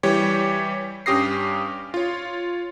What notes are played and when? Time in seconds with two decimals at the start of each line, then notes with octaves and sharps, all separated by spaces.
0.03 E3 G3 G4 C#5
1.06 G2 C#4 G4 D#6 A#6 C7
1.94 F4 C#5